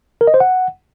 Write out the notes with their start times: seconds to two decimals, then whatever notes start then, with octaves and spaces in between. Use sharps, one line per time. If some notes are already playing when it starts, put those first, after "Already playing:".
0.21 A#4
0.27 D#5
0.34 C5
0.40 F#5